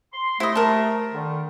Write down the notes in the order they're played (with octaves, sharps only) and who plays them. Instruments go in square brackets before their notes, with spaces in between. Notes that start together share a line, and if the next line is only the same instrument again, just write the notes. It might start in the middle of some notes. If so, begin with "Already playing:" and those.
[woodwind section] C6
[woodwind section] C3 A3 [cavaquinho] E4 D#5
[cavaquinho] A#4 A5
[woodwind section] D3 D#3